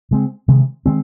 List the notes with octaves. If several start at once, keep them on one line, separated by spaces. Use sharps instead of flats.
C#3 G#3 C4
C3 D#3 G#3
D#3 G#3 C4